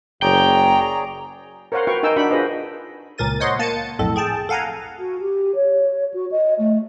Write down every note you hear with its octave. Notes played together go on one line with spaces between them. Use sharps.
F#1 G#4 C#5 D5 G5 A#5
A#4 C5 C#5 F5 F#5 C6
F#4 B4 F5 G5 C#6
D#4 A#4 G5 G#5 E6
D4 D#4 F#4 F#5 G5 B5
F4 G#4 B4 C5 D#5
C#2 A#2 A#4 A6 D#7
C5 C#5 D#5 F#5 C6
A#3 A5 A6 C#7 D#7
B1 F2 A2 A4
G#4 G5 A5
A4 F5 F#5 G#5 A#5
F#4
G4
C#5
F#4
D#5
A3